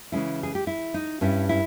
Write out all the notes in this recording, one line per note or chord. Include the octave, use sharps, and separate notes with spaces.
C#3 E3 G#3 C#4 E4
G#4
G4
E4
D#4
G2 G3 C#4 E4
E4